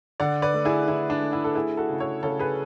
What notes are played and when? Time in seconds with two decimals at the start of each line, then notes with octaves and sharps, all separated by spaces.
0.20 D3 D5 F#5
0.42 B4 D5
0.54 A3
0.65 E4 G#4
0.88 D3 E4
1.10 D4
1.21 A3
1.33 E4
1.44 A4
1.55 A3 E4 G#4
1.77 F#4 A4
1.90 C#3
2.00 A4 C#5
2.23 C#3 A4 C#5
2.39 G#4 B4